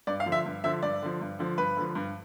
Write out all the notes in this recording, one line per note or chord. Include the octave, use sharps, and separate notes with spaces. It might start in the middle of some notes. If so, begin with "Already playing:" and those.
G2 D5
F5
D3 F3
E5
G2
D3 F3 E5
G2 D5
D3 F3
G2
D3 F3
G2 B4
D3 F3
G2